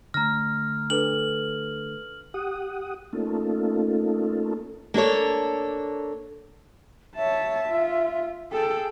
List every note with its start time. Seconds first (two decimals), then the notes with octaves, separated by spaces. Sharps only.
0.14 D3 A3 A#5 F6 A#6
0.90 D4 A4 B4 F#7
2.34 G4 F#5 D#6
3.13 A3 A#3 C#4 D#4 F4 A4
4.94 A#3 D4 A4 C#5
7.16 C#5 E5 A5
7.69 F4
8.52 G#4 A4 G5